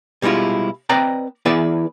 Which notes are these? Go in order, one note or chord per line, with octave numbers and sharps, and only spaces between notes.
B2 G3 G#3 E4 F4
C4 B4 D5 D#5 G5 A#5
E3 B3 E4 G#4 B4 D5